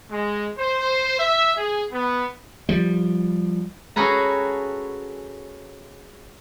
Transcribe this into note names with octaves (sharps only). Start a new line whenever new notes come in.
G#3
C5
E5
G#4
B3
F3 G3
C#4 F#4 G#4 A4 B4 A#5